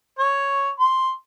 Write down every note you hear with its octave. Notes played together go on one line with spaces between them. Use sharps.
C#5
C6